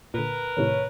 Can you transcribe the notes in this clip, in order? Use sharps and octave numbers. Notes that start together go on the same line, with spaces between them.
A#2 D3 A#4 B4
A2 C3 D#3 C#5